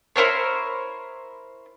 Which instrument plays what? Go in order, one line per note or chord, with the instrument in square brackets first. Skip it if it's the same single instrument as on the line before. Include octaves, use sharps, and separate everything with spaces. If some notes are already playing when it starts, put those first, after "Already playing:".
[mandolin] E4 A#4 C5 C#5